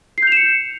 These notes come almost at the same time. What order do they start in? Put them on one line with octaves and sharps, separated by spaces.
C7 G6 F7 E7 C#7